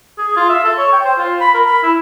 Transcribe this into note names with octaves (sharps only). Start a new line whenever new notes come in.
G#4
F4
E5
A4
C#5
G5
C5
F4
B5
A#4
B5
E4